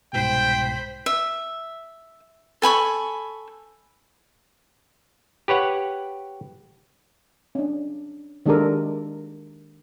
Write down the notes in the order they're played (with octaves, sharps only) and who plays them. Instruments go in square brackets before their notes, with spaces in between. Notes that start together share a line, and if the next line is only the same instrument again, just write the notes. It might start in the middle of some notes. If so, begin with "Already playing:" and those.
[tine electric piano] C2 G#2 B2 [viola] C5 B5 [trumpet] G5
[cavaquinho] E5
A4 G#5 B5 C#6
[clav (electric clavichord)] G4 B4 C#5 F#5
[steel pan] C#4 D4
D#3 G#3 D4 G4 A4 A#4